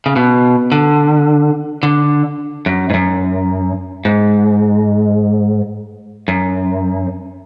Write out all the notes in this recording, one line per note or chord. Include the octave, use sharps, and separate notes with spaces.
C#3
B2
D3
D3
F#2
G#2
F#2
G#2
F#2